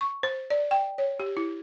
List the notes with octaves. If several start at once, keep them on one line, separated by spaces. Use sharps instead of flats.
C#6
C5
D5
G5
C#5
G4
E4